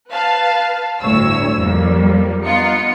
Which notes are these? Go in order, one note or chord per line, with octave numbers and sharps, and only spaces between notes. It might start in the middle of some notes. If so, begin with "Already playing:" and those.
B4 F5 A5
G1 D2 A2 C#5 E6
F2 G3 A#3
B3 D#4 F4 C#7